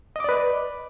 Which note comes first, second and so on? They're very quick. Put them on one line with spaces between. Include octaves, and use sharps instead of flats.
D#5 D6 D5 B4